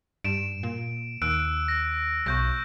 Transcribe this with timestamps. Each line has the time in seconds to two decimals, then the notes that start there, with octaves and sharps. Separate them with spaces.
0.24 G2 D7 E7
0.63 A#2
1.22 D#2 E6 F#6 D7
1.68 A#6
2.26 B1 C#6 G6 A#6